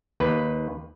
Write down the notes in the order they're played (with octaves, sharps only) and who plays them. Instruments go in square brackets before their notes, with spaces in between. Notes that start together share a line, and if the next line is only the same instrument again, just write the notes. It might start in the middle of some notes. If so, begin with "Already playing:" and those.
[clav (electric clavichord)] D#2 B4